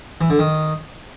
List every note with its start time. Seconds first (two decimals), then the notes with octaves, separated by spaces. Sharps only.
0.21 E3
0.30 D3
0.39 D#3